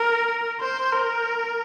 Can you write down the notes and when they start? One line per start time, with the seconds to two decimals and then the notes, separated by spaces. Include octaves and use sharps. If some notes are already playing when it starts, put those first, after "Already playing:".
Already playing: A#4
0.60 C5
0.92 A#4